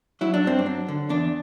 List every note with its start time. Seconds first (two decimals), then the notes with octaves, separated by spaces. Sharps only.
0.21 F#3 E4
0.34 D4
0.44 G2 C4
0.59 D4
0.66 F#3
0.88 D3
1.09 E2 D4